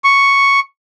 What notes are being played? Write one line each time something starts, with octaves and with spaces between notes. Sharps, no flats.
C#6